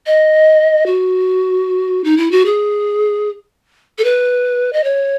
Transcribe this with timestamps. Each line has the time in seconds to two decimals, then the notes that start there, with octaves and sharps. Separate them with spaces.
0.06 D#5
0.86 F#4
2.04 D#4
2.17 E4
2.31 F#4
2.45 G#4
3.98 A4
4.04 B4
4.73 D#5
4.84 C#5